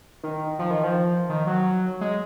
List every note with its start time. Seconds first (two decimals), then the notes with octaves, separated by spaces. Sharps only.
0.23 D#3
0.59 F3
0.71 D#3
0.84 F3
1.30 D#3
1.47 F#3
2.01 G#3